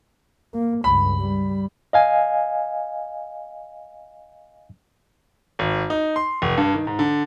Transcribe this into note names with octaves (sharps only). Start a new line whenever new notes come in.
A#3
C#2 G2 B5
G3
D#5 F5 G#5
G#1
D#4
C6
F1
G2
D#3
G#2
D3